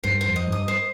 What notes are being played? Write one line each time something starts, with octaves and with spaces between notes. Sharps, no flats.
G2 C5
F2 C5
D#5
G2
D#6
C5